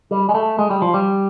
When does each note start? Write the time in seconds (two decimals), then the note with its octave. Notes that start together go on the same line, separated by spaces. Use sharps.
0.11 G3
0.29 G#3
0.34 A3
0.59 G#3
0.70 G3
0.82 F3
0.94 G3